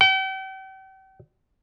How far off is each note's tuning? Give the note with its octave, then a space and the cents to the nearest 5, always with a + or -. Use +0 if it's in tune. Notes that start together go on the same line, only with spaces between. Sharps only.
G5 -40